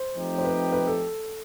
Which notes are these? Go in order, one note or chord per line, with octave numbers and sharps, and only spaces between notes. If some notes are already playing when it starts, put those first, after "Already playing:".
Already playing: C5
F3 A3 C4 D#4 G4
C5
B4
B4
A4